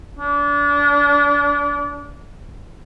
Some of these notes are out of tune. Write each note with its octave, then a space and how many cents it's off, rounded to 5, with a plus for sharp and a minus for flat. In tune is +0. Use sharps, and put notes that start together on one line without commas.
D4 -30